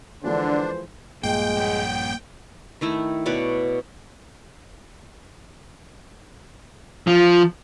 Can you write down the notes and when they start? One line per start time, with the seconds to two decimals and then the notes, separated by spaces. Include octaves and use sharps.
0.24 D3 E3 F3 G#3 D4 A4 B4 C5
1.23 A#1 G2 F3 G#3 A#3 G5
1.57 A#3 C#5 F#5
2.81 D#3 A3 E4
3.26 B2 B4 C#5 D5
7.07 F3